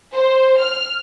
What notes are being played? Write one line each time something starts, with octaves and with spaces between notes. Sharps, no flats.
C5
F6